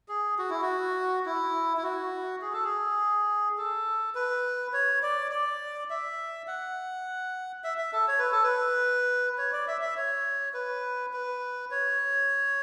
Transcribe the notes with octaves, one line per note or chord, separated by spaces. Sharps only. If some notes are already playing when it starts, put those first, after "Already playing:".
G#4
F#4
E4
F#4
E4
E4
F#4
G#4
A4
G#4
A4
B4
C#5
D5
D5
E5
F#5
E5
E5
A4
C#5
B4
A4
B4
C#5
D5
E5
E5
C#5
B4
B4
C#5